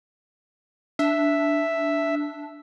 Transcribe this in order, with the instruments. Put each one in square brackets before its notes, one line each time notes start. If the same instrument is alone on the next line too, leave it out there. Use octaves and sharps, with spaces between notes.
[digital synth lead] D4 [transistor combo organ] E5